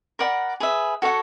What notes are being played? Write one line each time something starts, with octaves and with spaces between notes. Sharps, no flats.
A#4 D5 F#5 B5
G#4 B4 E5
F#4 A4 C#5 F#5